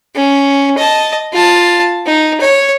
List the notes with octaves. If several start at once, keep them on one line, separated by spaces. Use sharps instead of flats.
C#4
D#5 A5
F4 A5
D#4
C#5